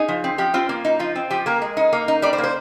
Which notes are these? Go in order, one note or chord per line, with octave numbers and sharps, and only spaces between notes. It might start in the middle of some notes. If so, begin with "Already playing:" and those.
Already playing: D#4 G#4
F3
C4
F3 G4
C4 F4
A#3
D#4
F3 F4
C4
F3 G4
A#3 A#4
G#3
D#4
A#3
D#4
G3 D5
C5
A#3
C5